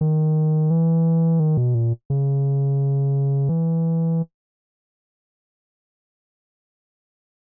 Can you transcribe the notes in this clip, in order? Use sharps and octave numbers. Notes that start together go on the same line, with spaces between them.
D#3
E3
D#3
B2
A#2
C#3
E3